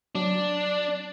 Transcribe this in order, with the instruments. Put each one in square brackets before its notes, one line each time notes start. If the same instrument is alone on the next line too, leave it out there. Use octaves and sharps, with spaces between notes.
[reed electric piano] F#3 [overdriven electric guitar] D4